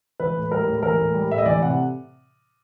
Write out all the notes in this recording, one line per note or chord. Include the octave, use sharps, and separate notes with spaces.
E3 B4
A2
G3 A#4
A2
E3 A#4
A2
G3
A2 E5
D#5
E3 D5
C3 F#5